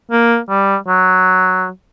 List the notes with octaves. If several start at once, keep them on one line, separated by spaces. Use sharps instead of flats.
A#3
G3
F#3